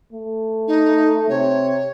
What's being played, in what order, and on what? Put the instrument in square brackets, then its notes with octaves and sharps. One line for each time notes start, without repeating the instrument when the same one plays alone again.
[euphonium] A3
[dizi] D#4
[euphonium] C3 [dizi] C#5